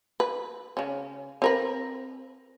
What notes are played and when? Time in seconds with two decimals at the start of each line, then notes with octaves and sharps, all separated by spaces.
0.20 B4
0.77 C#3 C#4
1.42 C4 A#4 B4